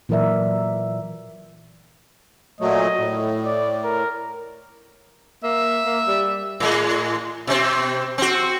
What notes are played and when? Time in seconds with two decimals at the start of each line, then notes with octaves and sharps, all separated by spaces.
0.09 A#2 E3 F#3 A#4 D5 E5
2.61 A#2 F#3 A3 D#5
2.98 A2
3.46 D5
3.84 A#4
5.43 A#3 E5
5.85 A#3
6.07 G3
6.60 A2 G#3
7.47 B2 C4
8.18 C4 F#4